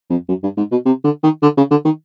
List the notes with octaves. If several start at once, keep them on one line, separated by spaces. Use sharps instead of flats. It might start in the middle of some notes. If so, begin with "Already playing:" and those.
F2
F#2
G2
G#2
B2
C3
D3
D#3
D3
C#3
D3
D#3